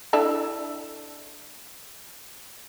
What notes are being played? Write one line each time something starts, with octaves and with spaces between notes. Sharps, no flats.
D4 E4 A4